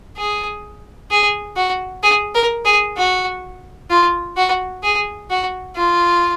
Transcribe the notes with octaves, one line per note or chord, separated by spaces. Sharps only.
G#4
G#4
F#4
G#4
A#4
G#4
F#4
F4
F#4
G#4
F#4
F4